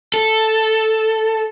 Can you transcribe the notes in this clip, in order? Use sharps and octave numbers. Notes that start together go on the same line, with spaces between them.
A4